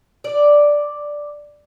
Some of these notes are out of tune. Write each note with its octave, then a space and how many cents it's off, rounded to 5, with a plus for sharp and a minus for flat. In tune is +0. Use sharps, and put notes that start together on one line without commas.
D5 +0